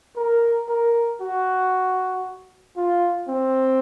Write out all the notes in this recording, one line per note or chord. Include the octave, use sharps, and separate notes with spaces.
A#4
A#4
F#4
F4
C4